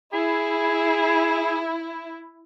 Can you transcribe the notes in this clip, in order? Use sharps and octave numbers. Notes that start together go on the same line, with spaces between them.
E4 G#4